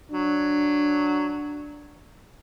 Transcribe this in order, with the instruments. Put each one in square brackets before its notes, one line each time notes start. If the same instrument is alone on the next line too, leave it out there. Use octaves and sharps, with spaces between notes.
[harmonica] F#3 [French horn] D4